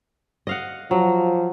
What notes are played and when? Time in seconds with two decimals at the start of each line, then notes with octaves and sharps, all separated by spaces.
0.47 D#5 F5 F#5
0.91 F3 F#3